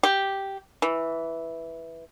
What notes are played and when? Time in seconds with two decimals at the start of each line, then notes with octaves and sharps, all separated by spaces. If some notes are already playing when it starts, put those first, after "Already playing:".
0.03 G4
0.82 E3